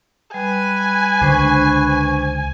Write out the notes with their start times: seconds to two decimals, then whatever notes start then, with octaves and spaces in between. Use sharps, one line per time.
0.34 G3 B4 G#5
1.21 C#2 D3 D4 C5 C#6